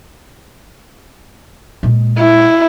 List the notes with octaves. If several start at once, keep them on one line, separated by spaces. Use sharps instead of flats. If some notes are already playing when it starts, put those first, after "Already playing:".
A#2 G#3
E4